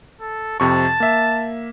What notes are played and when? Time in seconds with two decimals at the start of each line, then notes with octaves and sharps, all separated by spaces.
0.21 A4
0.60 F2 C3 A5 C#6
1.00 A#3 E5